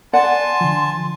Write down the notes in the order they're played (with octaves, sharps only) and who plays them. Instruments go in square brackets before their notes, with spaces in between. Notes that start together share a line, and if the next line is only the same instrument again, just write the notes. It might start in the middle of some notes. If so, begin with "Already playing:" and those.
[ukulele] D5 F#5 [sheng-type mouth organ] G#5 A5 [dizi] C6
[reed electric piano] D3 F3